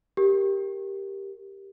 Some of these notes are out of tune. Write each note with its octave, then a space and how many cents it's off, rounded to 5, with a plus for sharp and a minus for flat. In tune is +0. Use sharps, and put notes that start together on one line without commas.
G4 +0 A#4 +0